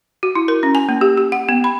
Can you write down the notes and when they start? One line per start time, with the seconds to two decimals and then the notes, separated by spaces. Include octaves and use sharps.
0.23 F#4
0.35 E4
0.48 A#4
0.63 C#4
0.75 G#5
0.89 A#3
1.01 G4
1.18 G4
1.32 F#5
1.49 B3
1.64 B5